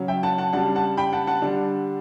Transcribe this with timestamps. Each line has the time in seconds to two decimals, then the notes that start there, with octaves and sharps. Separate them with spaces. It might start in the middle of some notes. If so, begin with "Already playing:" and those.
Already playing: C#3 F#3 C#4
0.08 E5 G5
0.23 F#5 A5
0.38 F#5 A5
0.53 C#3 G3 D4 F#5 A5
0.75 F#5 A5
0.97 G5 B5
1.13 F#5 A5
1.27 F#5 A5
1.42 D3 G3 D4